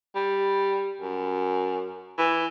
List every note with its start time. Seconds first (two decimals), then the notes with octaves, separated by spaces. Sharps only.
0.15 G3
1.01 F#2
2.18 E3